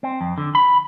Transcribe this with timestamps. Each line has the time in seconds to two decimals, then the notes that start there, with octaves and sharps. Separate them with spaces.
0.03 C4
0.21 F2
0.38 D3
0.55 B5